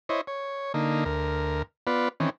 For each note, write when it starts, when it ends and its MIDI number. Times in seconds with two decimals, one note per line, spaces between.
0.09 0.21 64
0.09 0.21 72
0.09 0.21 73
0.09 0.21 75
0.27 0.72 73
0.74 1.04 50
0.74 1.04 58
0.74 1.04 63
1.05 1.62 38
1.05 1.62 70
1.87 2.09 59
1.87 2.09 65
1.87 2.09 71
1.87 2.09 74
2.20 2.30 51
2.20 2.30 52
2.20 2.30 60
2.20 2.30 61